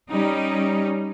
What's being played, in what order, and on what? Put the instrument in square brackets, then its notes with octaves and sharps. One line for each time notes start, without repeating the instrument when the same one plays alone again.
[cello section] G3 C#4 D#4